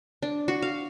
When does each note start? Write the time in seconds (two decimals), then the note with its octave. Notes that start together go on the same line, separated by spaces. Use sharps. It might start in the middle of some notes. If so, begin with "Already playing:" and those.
0.22 D4
0.48 F#4
0.62 F5